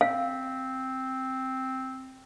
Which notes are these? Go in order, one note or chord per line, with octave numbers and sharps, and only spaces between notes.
C4 F5